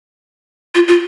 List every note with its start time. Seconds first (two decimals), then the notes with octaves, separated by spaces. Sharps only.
0.75 F4
0.88 F4